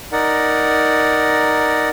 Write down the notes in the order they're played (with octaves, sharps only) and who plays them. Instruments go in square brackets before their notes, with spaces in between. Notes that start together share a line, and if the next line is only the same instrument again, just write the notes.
[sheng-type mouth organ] D#4 A#4 D5 F#5